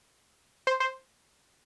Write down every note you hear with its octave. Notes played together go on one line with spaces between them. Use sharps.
C5
C5